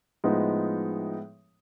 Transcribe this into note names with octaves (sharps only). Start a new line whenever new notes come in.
A2 F3 G#3 B3 D#4